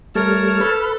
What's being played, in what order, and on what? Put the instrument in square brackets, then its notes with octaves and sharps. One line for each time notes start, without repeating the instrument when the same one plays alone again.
[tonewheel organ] G3 A3 [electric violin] A#4 [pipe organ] C#5 A5 [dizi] F6
[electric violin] A4 [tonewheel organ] B4